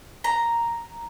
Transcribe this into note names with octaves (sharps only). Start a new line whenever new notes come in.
A#5